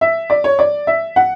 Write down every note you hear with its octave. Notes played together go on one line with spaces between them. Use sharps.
E5
D5
C#5
D5
E5
F#5